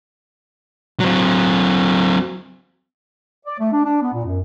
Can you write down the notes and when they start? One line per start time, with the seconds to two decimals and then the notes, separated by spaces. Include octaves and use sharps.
1.00 F#3 C4
3.45 D5
3.59 A3
3.72 D4
3.84 D4
4.01 B3
4.13 A#2
4.25 F#2